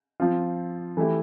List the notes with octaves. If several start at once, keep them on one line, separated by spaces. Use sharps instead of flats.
F3 C4 F4
E3 A3 E4 G4